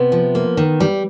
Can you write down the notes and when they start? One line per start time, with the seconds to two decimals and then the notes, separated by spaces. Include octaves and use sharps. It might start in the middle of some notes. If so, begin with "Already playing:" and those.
Already playing: C3 B3
0.12 F3
0.35 A#3
0.57 D#3
0.80 G3